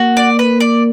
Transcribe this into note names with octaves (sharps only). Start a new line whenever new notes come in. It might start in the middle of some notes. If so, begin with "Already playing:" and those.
Already playing: A#3 F#4
D5
B4
D5